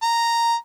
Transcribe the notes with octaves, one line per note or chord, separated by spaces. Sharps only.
A#5